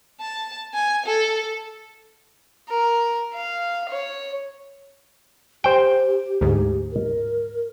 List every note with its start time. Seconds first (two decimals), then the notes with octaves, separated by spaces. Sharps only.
0.21 A5
0.74 G#5
1.06 A4
2.69 A#4
3.34 F5
3.89 C#5
5.64 G4 C5 G5
6.41 D2 G#2 G4
6.92 A#4